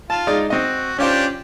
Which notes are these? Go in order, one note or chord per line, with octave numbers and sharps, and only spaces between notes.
F4 A5
G#3 D#4 D5
C4 F#4 D#5
C#4 D4 F4 G4 C5